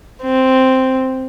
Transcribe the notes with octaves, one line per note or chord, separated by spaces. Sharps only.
C4